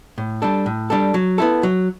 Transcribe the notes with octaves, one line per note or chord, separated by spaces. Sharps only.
A2
G3 D4 A4
A2
G3 D4 A4
F#3
B3 E4 A4
F#3